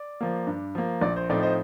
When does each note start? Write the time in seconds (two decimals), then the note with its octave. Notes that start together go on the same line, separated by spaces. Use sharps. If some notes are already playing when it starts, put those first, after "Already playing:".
Already playing: D5
0.21 F3 A#3
0.47 G2
0.75 F3 A#3
1.02 A#1 D5
1.16 C5
1.29 A2 F3 C4 D#4 D5
1.43 C5 D#5